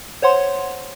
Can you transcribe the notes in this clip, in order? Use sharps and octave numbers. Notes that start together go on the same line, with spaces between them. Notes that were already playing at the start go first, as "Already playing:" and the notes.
C5 C#5 F#5 C6